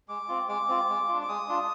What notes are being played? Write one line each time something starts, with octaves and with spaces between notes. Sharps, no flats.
G#3 D6
C4 F4
G#3 D6
C4 F4
G#3
D4 F4
D6
G#3 D#6
D4 F4